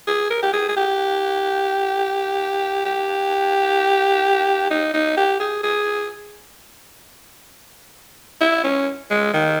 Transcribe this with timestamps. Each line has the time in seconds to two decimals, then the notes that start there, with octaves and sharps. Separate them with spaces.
0.07 G#4
0.30 A#4
0.42 G4
0.53 G#4
0.68 G#4
0.77 G4
2.85 G4
4.70 D#4
4.94 D#4
5.17 G4
5.40 G#4
5.63 G#4
8.41 E4
8.64 C#4
9.10 G#3
9.34 D#3